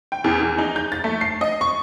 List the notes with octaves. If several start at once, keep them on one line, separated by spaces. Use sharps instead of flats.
G5
E2
E2
D#4
G6
A6
A3
C7
D#5
C#6